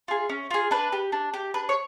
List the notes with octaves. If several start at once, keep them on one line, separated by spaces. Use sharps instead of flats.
F4 G#4
C#4
F4 G#4
D4 B4
G4
D4
G4
D4 B4
C#5